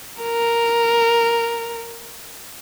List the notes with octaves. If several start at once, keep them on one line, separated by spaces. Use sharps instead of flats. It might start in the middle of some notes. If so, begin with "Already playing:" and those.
A#4